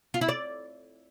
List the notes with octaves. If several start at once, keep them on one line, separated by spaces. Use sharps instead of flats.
F4
E4
D5